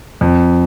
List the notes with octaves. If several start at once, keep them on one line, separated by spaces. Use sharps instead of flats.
F2